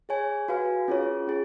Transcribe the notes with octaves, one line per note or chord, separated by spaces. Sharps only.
G#4 C#5 G#5
F#4 B4 F5 G#5
C#4 F4 G#4 C#5
C#4 G#4